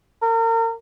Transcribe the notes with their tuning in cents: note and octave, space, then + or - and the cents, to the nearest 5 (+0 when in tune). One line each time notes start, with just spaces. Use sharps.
A#4 -35